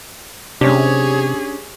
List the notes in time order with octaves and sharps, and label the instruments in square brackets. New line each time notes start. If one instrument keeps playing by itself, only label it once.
[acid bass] C3 [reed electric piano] C#4 D4 [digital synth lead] G4 [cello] G#4 C#5